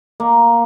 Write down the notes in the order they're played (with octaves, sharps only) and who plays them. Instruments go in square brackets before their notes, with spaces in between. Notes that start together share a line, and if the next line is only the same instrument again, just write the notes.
[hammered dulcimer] A#3